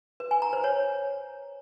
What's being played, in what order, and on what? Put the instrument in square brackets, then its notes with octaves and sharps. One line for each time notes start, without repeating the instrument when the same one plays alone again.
[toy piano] B4
G#5
A#5
C5
C#5